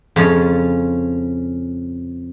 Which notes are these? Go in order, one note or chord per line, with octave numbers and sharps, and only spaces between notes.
F2 C#3 C#4 F4 C#5